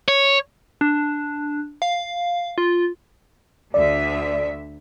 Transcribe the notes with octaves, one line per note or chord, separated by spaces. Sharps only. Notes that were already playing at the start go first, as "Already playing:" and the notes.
C#5
D4
F5
F4
D2 D3 D5 E5